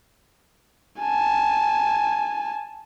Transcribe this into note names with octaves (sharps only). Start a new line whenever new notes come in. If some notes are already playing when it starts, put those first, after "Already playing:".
G#5 A5